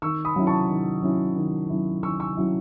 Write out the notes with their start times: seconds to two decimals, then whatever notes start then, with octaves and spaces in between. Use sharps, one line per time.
0.02 D#3 C#6 E6
0.25 B5 D#6
0.36 F#3 C#4 E4
0.47 A5 C#6
0.70 D#3
1.03 F#3 C#4 E4
1.36 D#3
1.70 F#3 C#4 E4
2.03 D#3 C#6 E6
2.20 C#6 E6
2.37 F#3 C#4 E4